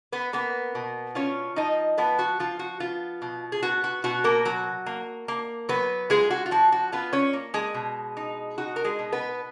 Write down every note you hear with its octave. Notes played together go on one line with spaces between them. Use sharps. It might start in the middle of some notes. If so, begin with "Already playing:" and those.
B3 B4
A#3 B3 B4
B2
C#4 F4 C#5
F3 D#4 D#5
F3 B3 B4
F#4
F3 F4
F#4
B3 F4
B2
G#4
B3 F#4
F#4
B2 F#4
A#3 A#4
F#3 F#4
A#3
A#3
F#3 B3 B4
G#3 F4 G#4
F#4
F4
F3 F#4
F#4
B3 F4 B4
C#4 C#5
A#3
G#3 G#4
B2
D#4
D#4 F#4
A#4
G#3 G#4
B2
B3 B4